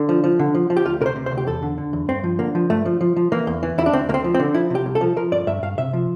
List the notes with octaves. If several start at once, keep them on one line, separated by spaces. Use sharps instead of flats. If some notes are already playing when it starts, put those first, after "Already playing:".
Already playing: D3
F3
F3
D3
F3
F3
G4
D2 F4
C3 A#4
C5
C3
C5
D2
G4
E2 A4
D3
D3
E2
G2 C4
F3
D3 A#3
F3
G2 A3
F3
F3
F3
E3 A#3
E2
E3
E2 E4
D4
D2 C4
D2 A#3
C4
F3
C4
D3
F3 E4
C3 G4
C2
A4
F3
F3 A#4
G2 D5
G2 E5
G2 F5
C3 E5
F3